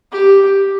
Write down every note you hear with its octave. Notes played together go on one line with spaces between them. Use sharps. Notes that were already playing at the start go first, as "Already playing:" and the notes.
G4